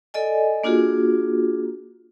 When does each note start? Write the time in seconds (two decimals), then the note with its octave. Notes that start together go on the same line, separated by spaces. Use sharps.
0.14 A4 D5 D#5 G#5
0.64 A#3 D4 F4 F#4 G#4